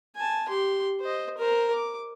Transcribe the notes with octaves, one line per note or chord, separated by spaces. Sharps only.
G#5 A5
G4 C6
C5 D#5
A#4 C5
D6